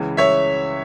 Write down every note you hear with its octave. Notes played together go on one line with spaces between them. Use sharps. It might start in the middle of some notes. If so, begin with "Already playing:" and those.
Already playing: C#2 C#3 E3
C#5 E5